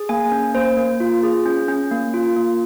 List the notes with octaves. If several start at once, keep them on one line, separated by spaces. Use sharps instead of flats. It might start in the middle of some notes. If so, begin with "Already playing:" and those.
Already playing: G#4
A#3 G#5
C#4
A#3 C5
A#3
F4
G#4
C#4
C#4
A#3
F4
A#3